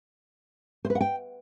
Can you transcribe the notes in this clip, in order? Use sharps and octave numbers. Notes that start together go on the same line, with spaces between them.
C5
B4
F#5
G5